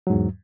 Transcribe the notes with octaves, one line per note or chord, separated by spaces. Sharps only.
E2 G#2 F#3